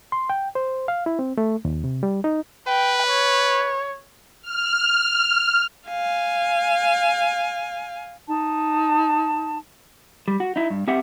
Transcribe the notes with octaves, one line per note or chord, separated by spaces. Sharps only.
C6
G5
C5
F5
E4
C4
A3
D#2
C3
G3
D#4
B4 G5
C#5
F6
F5 G#5
D#4 A5
G3
F#4
D#4 E4
G2
C4 G4 E5 F#5